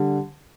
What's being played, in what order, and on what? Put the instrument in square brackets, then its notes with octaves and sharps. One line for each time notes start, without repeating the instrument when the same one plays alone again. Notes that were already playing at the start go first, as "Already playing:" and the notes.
Already playing: [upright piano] D3 G3